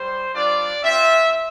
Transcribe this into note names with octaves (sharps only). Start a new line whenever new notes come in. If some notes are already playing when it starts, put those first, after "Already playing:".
Already playing: G3 C5
G3 D4 F4 D5
C4 F4 E5